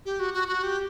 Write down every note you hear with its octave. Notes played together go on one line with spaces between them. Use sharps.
G4
F#4
F#4
F#4
G4